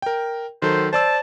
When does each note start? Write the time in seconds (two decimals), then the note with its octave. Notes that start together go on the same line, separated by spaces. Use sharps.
0.02 A#4 G5
0.62 D#3 F#3 A4 C5
0.93 C5 D5 A5 E6